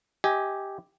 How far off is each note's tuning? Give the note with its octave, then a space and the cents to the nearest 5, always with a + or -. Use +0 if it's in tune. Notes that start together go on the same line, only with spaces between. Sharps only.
G4 +0 D#5 +35 G#5 +0